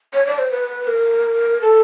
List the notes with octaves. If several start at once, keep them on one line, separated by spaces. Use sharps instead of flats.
C#5
D5
C5
B4
A#4
A4